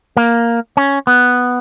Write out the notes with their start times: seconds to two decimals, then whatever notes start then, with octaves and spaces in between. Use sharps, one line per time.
0.17 A#3
0.77 C#4
1.07 B3